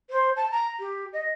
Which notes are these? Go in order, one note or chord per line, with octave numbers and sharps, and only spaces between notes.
C5
A5
A#5
G4
D#5